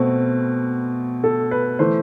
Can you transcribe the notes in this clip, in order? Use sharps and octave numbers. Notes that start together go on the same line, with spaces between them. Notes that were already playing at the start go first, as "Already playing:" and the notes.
Already playing: B2 A3 C4
A4
B4
E3 A3 C5